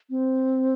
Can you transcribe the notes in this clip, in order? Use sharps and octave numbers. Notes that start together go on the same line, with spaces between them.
C4